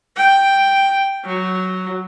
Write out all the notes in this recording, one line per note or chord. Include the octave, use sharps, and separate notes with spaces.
G5
F#3